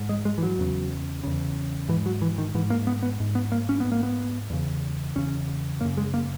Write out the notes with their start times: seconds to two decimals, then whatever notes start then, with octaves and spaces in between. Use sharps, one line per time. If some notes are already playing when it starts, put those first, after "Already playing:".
Already playing: G#2
0.09 G#3
0.25 G#3
0.38 E3
0.43 F#3
0.58 E2 C#3
1.24 E2 C#3
1.88 G#2 E3
2.06 F#3
2.22 E3
2.38 D#3
2.55 G#2 E3
2.70 A#3
2.87 B3
3.03 B3
3.20 G#2
3.35 B3
3.52 A#3
3.69 C#4
3.80 G#2 B3
3.92 A#3
4.03 B3
4.50 E2 C#3
5.15 E2 C#3 C#4
5.81 F#2 C#3 A#3
5.97 G#3
6.14 A#3